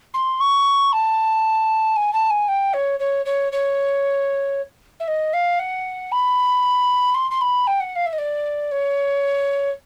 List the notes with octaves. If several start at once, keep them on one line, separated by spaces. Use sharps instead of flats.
C6
C#6
A5
G#5
A5
G#5
G5
C#5
C#5
C#5
C#5
E5
D#5
F5
F#5
B5
C6
C6
B5
G5
F#5
F5
E5
D#5
D5
C#5